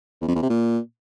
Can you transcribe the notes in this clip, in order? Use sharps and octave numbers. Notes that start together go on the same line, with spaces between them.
E2
F2
E2
C3
A#2